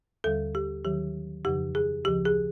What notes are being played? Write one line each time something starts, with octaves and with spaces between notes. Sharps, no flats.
D#2 D3 G3 A4
G4
D#2 D#3 F#3 G4
F2 C#3 F3 G4
G#4
D2 C#3 F3 G4
G#4